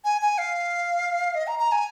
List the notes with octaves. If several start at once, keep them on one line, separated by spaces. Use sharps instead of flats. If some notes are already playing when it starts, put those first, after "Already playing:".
G#5
G#5
F5
D#5
A#5
A#5
G#5